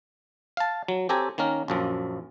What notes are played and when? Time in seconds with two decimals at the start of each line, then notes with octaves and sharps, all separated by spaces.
0.57 F5 A5
0.88 F#3
1.09 C4 G4 A4 C#5 G#5 A#5
1.38 D#3 A#3 C#4 A#4
1.68 A#1 F#2 F3